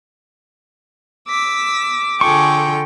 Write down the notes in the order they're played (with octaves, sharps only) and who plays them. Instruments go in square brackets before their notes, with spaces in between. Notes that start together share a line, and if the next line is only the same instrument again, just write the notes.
[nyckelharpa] D6 [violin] E6 B6
[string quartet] D3 F4 G5 [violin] G#4 A4 [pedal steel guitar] C#6